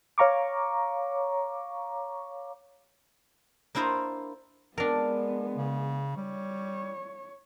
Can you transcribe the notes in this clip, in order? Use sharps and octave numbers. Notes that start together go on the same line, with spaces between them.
C#5 F5 A#5 C#6 D6
A#3 D4 E4 C5 D#5 F5
G#3 B3 D4 A#4
C#3
G3 C#5